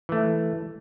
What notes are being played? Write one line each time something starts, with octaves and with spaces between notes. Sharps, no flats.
E3 A3